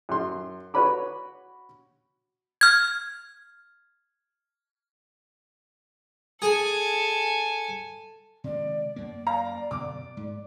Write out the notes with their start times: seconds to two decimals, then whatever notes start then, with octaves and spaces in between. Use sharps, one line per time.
0.09 F#2 C6
0.74 F#4 B4 C#5 B5 D6
2.61 F6 G#6
6.42 G#4 A4 G#5
8.44 C3 D#3 G#3 D5
8.96 F#2 A#3
9.27 F5 A#5
9.71 F#2 B2 D3 D6
10.17 G#2